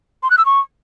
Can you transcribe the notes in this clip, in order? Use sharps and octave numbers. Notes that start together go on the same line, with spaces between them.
C6
F#6
E6
C#6